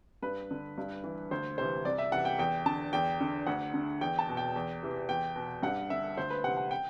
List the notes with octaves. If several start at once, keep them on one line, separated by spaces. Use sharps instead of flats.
G2 B4
D3
G2
E3
D2 C5
C3 E3 C5
C2 D5
E5
C3 E3 F#5
G5
E2 G5
D3 A5
E2 G5
D3
D2 F#5
D3
E2 G5
A5
B2
G5
E2
C3 E3
E2 G5
B2
G2 F#5
D3 E5
D2 C5
B4
C3 E3 F#5
F#5
G5